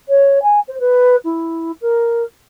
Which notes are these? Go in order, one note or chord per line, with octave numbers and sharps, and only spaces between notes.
C#5
G#5
C5
B4
E4
A#4